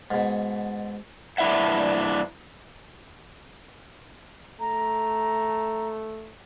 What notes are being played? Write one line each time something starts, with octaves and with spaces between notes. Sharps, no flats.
G#2 B2
G2 D4 E4 E5 F#5
A3 A#5